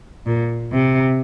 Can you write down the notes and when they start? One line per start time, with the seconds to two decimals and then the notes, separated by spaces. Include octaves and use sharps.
0.26 A#2
0.72 C3